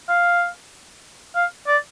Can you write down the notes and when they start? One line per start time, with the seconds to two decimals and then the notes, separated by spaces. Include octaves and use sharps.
0.09 F5
1.35 F5
1.67 D5